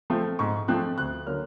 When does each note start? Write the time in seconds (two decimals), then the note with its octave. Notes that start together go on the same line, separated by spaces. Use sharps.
0.10 F3 A3 C4
0.39 G#2 C#6
0.68 F3 A3 C4 F#6
0.98 D2 F#6
1.27 D3 F#3 A#3 F6